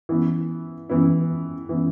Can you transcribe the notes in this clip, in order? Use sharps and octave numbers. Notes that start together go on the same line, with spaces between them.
E3 B3 E4
E3 B3 E4
E3 B3 E4